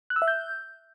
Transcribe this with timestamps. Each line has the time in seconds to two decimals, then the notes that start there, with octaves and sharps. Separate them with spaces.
0.10 F#6
0.16 E6
0.22 E5
0.28 G6